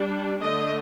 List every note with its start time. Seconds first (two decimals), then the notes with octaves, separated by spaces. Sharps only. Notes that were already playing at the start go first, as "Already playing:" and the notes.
Already playing: G3 D4
0.41 D3 A3 D4 D#5